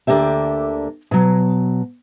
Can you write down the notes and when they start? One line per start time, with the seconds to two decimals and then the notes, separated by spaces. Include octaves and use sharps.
0.07 D2 D3 A#3 D4 G4 E5
1.11 B2 F#3